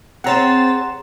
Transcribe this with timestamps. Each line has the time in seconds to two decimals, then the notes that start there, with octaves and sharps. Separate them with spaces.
0.24 C4 G#4 C#5 F#5 A#5 C6 A6 E7